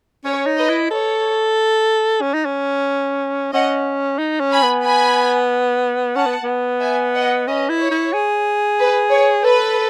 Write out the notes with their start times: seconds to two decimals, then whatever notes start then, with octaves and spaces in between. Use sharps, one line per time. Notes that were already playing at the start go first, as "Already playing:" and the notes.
0.25 C#4 C#5
0.46 D#4
0.58 B4 D#5
0.69 E4
0.90 A4 C#5
2.22 C#4
2.34 D#4
2.46 C#4
3.53 C#4 D#5 F#5
4.19 D#4
4.40 C#4
4.52 G#5 B5
4.63 B3
4.84 G#5 B5
6.16 C#4 F#5 A5
6.26 B3
6.44 B3
6.81 E5 G#5
7.14 D#5 F#5
7.47 C#4 B4 D#5
7.69 E4
7.80 C#5
7.91 E4
8.13 G#4
8.79 B4
9.11 C#5
9.44 A4 B4